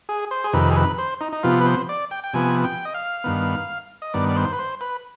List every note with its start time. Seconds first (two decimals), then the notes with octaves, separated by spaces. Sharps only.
0.09 G#4
0.31 C5
0.44 G#4
0.53 F2 C3 D#3 B4
0.71 G#4
0.76 B4
0.98 C5
1.21 D#4
1.32 D#4
1.43 C3 F3 B3 F4
1.61 B4
1.66 C5
1.89 D5
2.11 G5
2.24 G5
2.34 C3 F3 B3 G#5
2.64 G5
2.85 D#5
2.94 F5
3.24 G2 D#3 B3
4.02 D#5
4.14 G2 D#3 B3 D5
4.29 D5
4.36 C5
4.53 B4
4.59 C5
4.81 B4